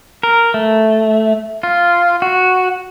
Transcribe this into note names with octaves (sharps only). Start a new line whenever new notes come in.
A#4
A3
F4
F#4